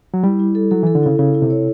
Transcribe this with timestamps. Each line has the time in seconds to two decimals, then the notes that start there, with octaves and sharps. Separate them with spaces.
0.14 F#3
0.23 G3 E4
0.39 E4
0.55 A4
0.71 F#3 A4
0.83 E3 A4
0.95 D3
1.03 C#3 E4
1.19 C#3 E4
1.34 E4
1.42 C3
1.50 C#5